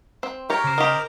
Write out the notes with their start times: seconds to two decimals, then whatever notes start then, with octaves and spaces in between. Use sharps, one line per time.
0.23 C4
0.50 G4 A#4 C#5 A#5
0.64 C#3 C5
0.78 D#3 G4